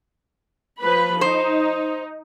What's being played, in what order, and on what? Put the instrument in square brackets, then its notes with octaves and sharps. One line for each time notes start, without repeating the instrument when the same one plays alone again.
[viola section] F3 B4 B5
[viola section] D#4 [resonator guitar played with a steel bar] C5